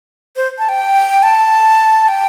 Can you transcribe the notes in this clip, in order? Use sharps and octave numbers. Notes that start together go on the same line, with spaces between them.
C5
A5
G5
A5
G5